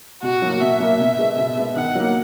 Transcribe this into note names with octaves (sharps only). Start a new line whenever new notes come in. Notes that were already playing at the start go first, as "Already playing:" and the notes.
B2 F#4
F#3 A#3
B2 E5
F#3 A#3
B2
G#3 B3
B2
G#3 B3
D#3 F#5
F#3 A#3